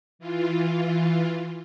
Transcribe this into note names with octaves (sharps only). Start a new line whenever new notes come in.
E3 F4